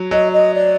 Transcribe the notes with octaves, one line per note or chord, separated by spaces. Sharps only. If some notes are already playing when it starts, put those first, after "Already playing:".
Already playing: F#3
F#3 D#5
D#5
D5